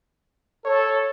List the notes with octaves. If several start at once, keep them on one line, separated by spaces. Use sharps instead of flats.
A4 C#5